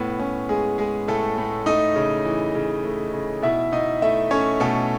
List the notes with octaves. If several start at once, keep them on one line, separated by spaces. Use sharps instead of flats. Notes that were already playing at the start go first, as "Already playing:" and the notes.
Already playing: A2 B3
A2 C#4
G#3 G#4
G#3 G#4
A2 A3 A4
A2
A3 D#4 D#5
C#3
E3
C#3
A3
C#3
B2 E4 E5
B2 D#4 D#5
A3 E4 E5
A3 C#4 C#5
B2 A3 A4